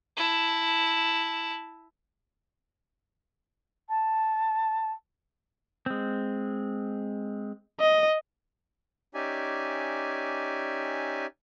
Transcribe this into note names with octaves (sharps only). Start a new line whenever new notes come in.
E4 A5
A5
G#3 C4
D#5
C#4 D#4 G4 D5 E5 G#5